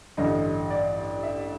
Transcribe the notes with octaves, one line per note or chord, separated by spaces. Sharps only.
A1 G2 D3 D#5
D5
E5